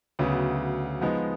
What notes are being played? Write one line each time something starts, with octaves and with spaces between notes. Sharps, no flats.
D2 C#3 F#3 B3
F3 G#3 B3 D#4